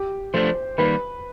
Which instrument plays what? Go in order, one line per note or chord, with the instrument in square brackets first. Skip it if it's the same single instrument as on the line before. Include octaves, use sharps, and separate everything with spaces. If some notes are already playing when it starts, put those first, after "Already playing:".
Already playing: [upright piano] G4
[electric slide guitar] F3 A3 D4 [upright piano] C5
[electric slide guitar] D#3 G3 A#3 [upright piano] B4